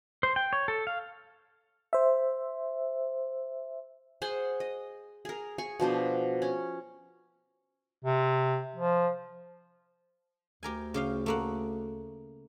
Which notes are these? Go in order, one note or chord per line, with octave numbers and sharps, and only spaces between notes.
C5
G5
C#5
A4
F5
C5 E5
G#4 C5 F#5 G#5
D#5
G#4 A#4
G#4 G#5 C#6
B2 F3 D4 C5
C#4
C3
F3
D2 G4 A#4 G#5
C#3 G4 F5
A3 A#3 F#5